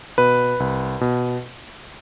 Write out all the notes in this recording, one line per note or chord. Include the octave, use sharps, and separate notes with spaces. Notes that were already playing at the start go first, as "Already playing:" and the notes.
B2 B4
C2
B2